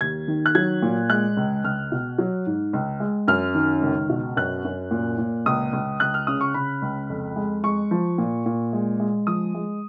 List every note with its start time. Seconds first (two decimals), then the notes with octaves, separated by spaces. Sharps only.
0.01 D#2 G#6
0.28 D#3
0.46 F#6
0.55 F#3 G#6
0.82 A#2
1.10 G#3 F#6
1.37 C#2
1.64 C#2 F6
1.92 B2
2.18 F#3
2.47 G#2
2.73 C#2
3.00 G#3
3.28 F#2 F6
3.55 D#3
3.82 C#2
4.09 B2
4.37 F#2 F#6
4.65 F#2
4.91 A#2
5.18 A#2
5.46 C#2 D#6
5.73 C#2
6.00 C#2 F#6
6.14 F6
6.27 C#3 D#6
6.41 C#6
6.54 C#3 B5
6.82 C#2
7.10 F2
7.36 G#3
7.64 G#3 C#6
7.91 F3
8.18 A#2
8.46 A#2
8.73 G#3
9.00 G#3
9.27 F3 D#6
9.54 G#3